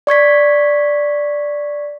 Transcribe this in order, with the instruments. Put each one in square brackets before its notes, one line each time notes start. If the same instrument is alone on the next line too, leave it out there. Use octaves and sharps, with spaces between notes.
[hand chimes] D5 C#6 G#6 B6